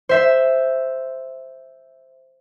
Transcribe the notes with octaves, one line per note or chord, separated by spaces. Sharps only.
C5 E5